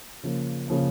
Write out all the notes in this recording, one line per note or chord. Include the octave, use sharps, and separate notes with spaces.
C#3 F3 A#3
C#3 F3 A#3